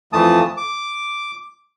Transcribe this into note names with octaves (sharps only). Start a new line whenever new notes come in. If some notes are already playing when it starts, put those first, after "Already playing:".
F2 E3 A3 A5 D#6
D6